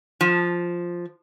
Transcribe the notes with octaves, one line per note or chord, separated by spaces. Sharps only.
F3